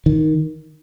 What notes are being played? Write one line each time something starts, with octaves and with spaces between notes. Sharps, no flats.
D#3